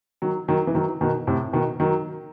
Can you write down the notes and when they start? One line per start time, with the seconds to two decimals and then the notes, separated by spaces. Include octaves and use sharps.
0.22 D#3 F#3
0.48 D#3 F#3
0.67 E3
0.75 D#3 F#3
1.01 B2 D#3
1.27 A2 C3
1.53 B2 D#3
1.80 D#3 F#3